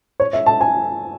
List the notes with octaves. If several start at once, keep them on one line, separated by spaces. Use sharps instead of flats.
C#5
E5
A5
G#5